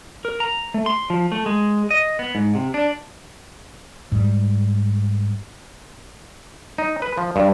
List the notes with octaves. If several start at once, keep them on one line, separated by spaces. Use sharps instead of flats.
A#4
A#5
A3
C6
F3
A3
G#3
D#5
B3
G#2
C3
D4
G#2 G3
D#4
B4
F3
G2